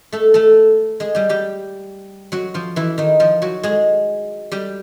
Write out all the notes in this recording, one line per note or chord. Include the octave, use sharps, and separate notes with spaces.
A3 A4
A3 A4
G#3 G#4
G3 G4
G3 G4
F#3 F#4
F3 F4
E3 E4
D#3 D#4
F3 F4
F#3 F#4
G#3 G#4
G3 G4